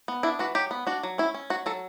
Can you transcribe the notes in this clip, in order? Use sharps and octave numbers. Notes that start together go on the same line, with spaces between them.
B3
D4 E4
E3 F#4
F#3 G4
B3
D4 F#4
F#3
C#4 E4
C#4
F#3 F#4
F#3 A4